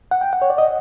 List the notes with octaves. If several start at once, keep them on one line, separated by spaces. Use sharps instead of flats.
F#5
G5
F#5
C#5
D5
D#5